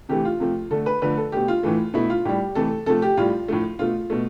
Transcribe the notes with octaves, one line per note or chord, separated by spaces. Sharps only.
C3 E3 A3 G4
F4
C3 F3 A3
D3 A3 A4
B4
D3 F3 A3 B4
A4
B2 A3 G4
F4
A2 E3 A3
B2 A3 E4
F4
A2 G3 G4
C3 E3 A3 A4
C3 F3 A3 A4
G4
A2 G3 F4
A2 F3 A3
B2 A3 F4
B2 A3